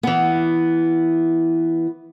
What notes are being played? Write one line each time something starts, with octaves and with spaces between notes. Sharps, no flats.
E3 B3